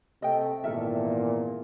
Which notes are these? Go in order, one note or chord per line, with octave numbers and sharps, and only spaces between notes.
C3 A3 D#5 G5
G#1 E2 A#2 A4 A#4 E5